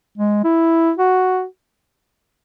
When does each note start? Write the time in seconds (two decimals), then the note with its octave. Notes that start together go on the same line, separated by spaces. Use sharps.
0.18 G#3
0.44 E4
0.97 F#4